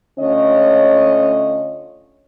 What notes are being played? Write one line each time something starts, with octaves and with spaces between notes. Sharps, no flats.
D3 A3 C#4 F4 C#5 D#5